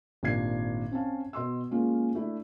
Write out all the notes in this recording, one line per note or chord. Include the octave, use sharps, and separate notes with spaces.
G#1 A#2 D4 G4 G#6 C7
C4 C#4 F5 A5
B2 D#5 C6 E6
G#3 A#3 C#4 F4
A3 D4 E4